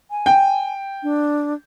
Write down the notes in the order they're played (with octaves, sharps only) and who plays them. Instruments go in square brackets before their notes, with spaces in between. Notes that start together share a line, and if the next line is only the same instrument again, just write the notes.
[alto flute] G#5
[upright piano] G5
[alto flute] D4